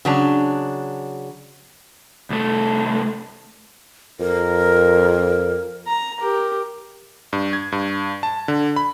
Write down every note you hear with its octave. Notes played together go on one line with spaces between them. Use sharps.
C#3 F#3 D4
C2 A3
F2 A#4
A#5
G4 A#4
G2
G#6
G2
A5
D3
B5